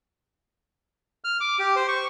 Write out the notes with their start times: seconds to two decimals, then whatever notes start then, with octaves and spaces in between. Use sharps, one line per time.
1.24 F6
1.40 D6
1.59 G4
1.76 C5
1.88 C#6